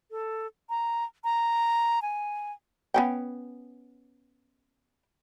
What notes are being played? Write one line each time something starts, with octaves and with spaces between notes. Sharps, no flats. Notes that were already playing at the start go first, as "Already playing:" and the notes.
A4
A#5
A#5
G#5
B3 C#4 G5